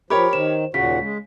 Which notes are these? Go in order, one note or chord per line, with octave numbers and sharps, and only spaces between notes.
F3 G4 A#4 C#5 B5
D#3 C5 E7
D#2 A#2 C#3 F#4 B6
G#3